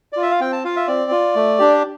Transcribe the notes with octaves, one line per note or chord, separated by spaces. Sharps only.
D5
F4
E5
F5
C4 G5
A5
F4 F5
E5
C4 D5
F4
A3
D4 G4